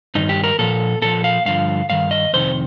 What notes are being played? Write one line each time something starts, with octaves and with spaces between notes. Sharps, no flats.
G2 D#3 D#4
G4
A#4
A#2 F3 A4
A#2 F3 A4
F5
G2 D3 F3 F5
G2 D#3 F5
D#5
F2 C3 D#3 C5